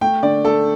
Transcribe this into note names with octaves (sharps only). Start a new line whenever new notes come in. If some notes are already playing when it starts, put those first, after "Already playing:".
A3 G5
D3 D5
A3 A4